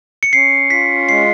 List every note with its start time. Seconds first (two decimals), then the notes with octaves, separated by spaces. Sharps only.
0.23 C#7
0.33 C#4 C7
0.70 F4 B6
1.08 G#3 C7